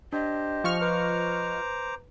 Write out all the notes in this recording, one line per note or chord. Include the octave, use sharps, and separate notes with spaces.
D4 G4 C5 D#5
F3 C#6 F6
B4 C5 A#5 D6